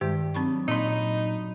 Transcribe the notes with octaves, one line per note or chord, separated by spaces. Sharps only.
G2 D#3 G#3 G4 G5
F#3 C4 D4 D#4 B5 C#6
A#2 F#3 C#4 D#4 B5 C6 B6